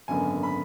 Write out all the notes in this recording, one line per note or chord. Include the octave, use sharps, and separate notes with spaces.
G#1 F#2 D3 F#3 B3 G#5
B5